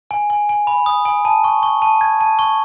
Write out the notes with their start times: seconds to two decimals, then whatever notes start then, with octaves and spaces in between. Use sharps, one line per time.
0.11 G#5
0.30 G#5
0.49 G#5
0.67 B5
0.86 D#6
1.05 G#5
1.25 A5
1.44 C#6
1.63 C#6
1.82 A5
2.01 G#6
2.21 A5
2.39 C#6